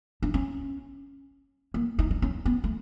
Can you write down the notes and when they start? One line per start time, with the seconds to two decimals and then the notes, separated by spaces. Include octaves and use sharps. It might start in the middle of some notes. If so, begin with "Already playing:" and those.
0.22 D4
0.34 C#4
1.74 A#3
1.99 D#4
2.11 D4
2.22 C#4
2.46 B3
2.64 A3